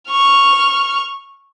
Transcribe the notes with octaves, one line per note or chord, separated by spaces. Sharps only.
C#6 F6